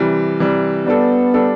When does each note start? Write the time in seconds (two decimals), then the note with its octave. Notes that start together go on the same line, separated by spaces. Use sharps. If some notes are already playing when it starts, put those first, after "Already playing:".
Already playing: C3 E3 G3
0.39 C3 E3 G3
0.86 G3 B3 D4 A4
1.34 G3 D4 A4